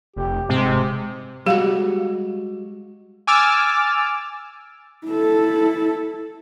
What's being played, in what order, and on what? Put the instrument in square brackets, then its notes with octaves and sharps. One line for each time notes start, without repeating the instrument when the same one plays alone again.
[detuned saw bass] F1 [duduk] G4
[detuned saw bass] G#2 [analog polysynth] C3 [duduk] G#3
[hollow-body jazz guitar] G3 G#3 F#4 [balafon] G4 F5
[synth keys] G#5 D6 E6 F6 A6
[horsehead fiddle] E4 A4